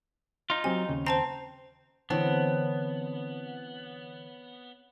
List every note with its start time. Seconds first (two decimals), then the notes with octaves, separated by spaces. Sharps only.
0.50 D#4 F4
0.64 F#3 C4 G4 G#5
0.89 D#2 C#3
1.07 C4 C5 A5 A#5
2.10 D3 E3 B3 C4 C#5 A5